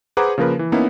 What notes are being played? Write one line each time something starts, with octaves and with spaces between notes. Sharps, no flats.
G#4 B4 C5 F#5 A#5 D6
C#3 F3 A#3 A#4 B4
E3
A#3 B3 C#4 D#4 E4